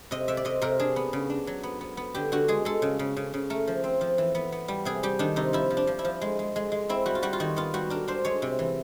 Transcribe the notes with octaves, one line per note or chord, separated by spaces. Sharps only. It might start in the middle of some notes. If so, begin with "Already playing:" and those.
C3 D#5
C3 E5
D5
C3 D#5
C3 A#4
D4 G#4
B3
C#3
D4
F#3
B3
B3
B3
D3 G4
D3 F#4
G#3 G#4
G#3 A4
C#3
C#3
C#3
C#3
A3 A#4
F3
C4
F3
E3
B3
B3
G3
C3 G#4
G3 G4
D#3 D4
C3 D#4
F3 E4
F3
D4
F3
E4
F3
G#3
G#3
G#3
G#3
C4 E4
G3 F#4
F4
G3 F#4
F4
D#3 F#4
B3 F4
G3 F#4
D4 A#4
D4 C5
G#3 C#5
C3
E3